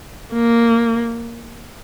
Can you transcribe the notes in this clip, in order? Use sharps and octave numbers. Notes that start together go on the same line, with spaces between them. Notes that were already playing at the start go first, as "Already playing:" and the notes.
A#3